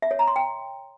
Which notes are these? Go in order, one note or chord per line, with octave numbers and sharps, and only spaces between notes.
E5
C#5
A#5
C6
G5